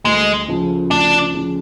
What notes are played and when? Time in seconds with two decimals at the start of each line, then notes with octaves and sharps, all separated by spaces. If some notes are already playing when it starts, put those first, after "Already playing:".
0.05 D2 G#3
0.48 C#3 F3
0.90 D2 D4
1.34 C#3 F3